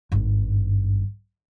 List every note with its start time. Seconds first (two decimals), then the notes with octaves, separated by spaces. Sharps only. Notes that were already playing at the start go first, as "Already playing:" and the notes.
0.12 G#1 G2